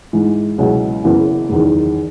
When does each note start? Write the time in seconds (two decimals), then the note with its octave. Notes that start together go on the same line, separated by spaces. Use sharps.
0.13 G#2 E3 G#3
0.58 C#2 B2 F#3 C#4 E4
1.04 F#1 F#2 C#3 E3 B3
1.50 F#1 E2 D#3